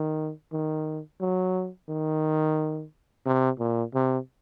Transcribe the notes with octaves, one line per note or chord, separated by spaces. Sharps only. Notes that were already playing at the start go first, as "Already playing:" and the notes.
Already playing: D#3
D#3
F#3
D#3
C3
A#2
C3